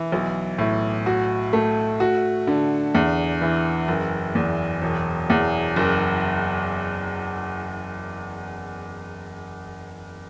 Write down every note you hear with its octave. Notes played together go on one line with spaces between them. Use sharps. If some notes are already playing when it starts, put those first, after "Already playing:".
Already playing: E3
B1
A2
F#4
A3
F#4
D3
E2
E3
F#1
E2
E1
E2
F#1